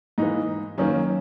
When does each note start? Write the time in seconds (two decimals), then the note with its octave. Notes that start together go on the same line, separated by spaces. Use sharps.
0.18 G#2 E3 A#3 D#4
0.78 F#2 D#3 A#3 C#4